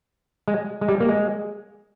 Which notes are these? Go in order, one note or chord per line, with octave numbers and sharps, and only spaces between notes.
G#3
G#3
G3
A#3
G#3